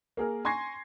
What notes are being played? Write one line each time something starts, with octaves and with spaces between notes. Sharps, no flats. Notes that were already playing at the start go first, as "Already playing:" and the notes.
A#3 G#4 A#4
G#5 C6 C#6 G#6 A#6 C7